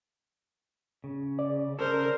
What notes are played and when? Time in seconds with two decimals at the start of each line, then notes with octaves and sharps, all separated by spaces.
1.04 C#3
1.39 D5
1.79 C#3 C#4 A4 A#4 C5